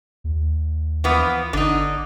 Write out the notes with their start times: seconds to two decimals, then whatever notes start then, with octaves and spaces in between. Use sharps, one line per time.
0.24 D#2
1.04 E3 F3 B3
1.53 G1 D3 D#4